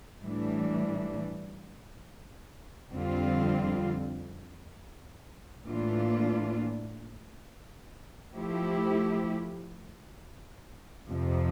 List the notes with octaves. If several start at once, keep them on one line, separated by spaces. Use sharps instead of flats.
A2 E3 G3 D4
F2 D3 G3 C4 F4
A2 E3 A#3 D4 F4
F3 A3 E4 G4
F2 C3 F3